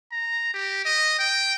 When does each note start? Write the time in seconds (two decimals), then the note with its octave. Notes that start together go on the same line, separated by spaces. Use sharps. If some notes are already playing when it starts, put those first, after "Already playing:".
0.12 A#5
0.54 G4
0.85 D#5
1.19 G5